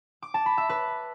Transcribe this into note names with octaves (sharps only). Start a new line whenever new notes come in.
D6
A5
B5
E5
B4